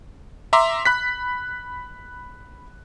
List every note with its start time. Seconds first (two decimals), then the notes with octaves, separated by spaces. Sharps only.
0.53 E5 A#5 C6 D6
0.85 B5 F#6 B6